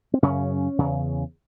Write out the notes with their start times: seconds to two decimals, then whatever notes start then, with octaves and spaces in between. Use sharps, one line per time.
0.14 C4
0.22 F#2 C#3 C#4
0.78 E2 C#3